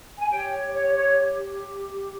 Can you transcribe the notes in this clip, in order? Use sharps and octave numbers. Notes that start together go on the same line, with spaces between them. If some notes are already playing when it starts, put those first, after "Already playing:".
G#5
G4 C#5 G5
C#5
C#5